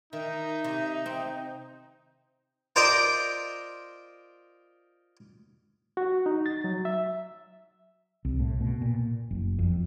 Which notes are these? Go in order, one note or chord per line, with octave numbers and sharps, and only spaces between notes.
D#3 D#4 E5
C3
C4
F4 A#4 C5 D5 D#5 G5
F#4
D#4
A6
F#3
E5
C2
A2
B2
A#2
F#1
F2